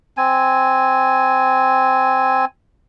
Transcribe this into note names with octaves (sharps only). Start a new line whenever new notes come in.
C4 G#5